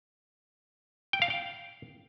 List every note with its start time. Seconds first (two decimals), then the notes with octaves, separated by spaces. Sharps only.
1.13 G5
1.22 F5
1.30 G5